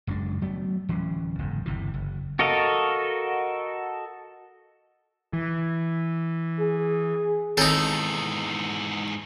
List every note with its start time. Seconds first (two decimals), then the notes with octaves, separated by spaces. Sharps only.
0.07 F#1 F#2 G#3 D4
0.42 F#3 A3 B3
0.89 D1 E3 F#3 C#4
1.38 F#1 E2 G#2
1.66 G1 C3 E3
1.94 F#1
2.39 F#4 A4 A#4 D#5 F5
5.33 E3
6.59 G#4
7.58 E2 G#2 D#3 C4 D#4 A4 C#5